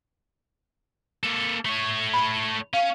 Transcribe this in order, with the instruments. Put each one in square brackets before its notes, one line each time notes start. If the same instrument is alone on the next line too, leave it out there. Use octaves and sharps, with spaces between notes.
[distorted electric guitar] A#3 A4
A3 C#5
[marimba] B5
[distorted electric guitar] C#4 [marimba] F5